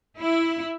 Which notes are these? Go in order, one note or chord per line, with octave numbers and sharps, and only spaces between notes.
E4